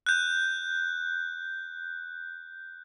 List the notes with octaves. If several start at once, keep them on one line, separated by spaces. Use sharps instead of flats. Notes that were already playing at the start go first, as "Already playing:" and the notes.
F#6 G6